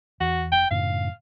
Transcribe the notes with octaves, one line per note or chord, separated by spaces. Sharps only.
E2 F#4
F1 G5
F#2 A2 C#3 F5